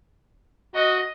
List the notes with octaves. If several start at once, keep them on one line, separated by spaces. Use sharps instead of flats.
F#4 D#5